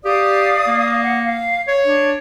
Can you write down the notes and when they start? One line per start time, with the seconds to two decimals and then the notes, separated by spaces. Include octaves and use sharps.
0.05 G4 D5 F5 D#6
0.68 A#3
1.04 F#5
1.23 F5
1.68 C#5
1.84 D4